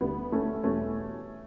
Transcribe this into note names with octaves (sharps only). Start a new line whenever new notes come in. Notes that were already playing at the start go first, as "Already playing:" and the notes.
D2 D3 G3 B3
A3 C#4
E2 B2 G3 A3 C#4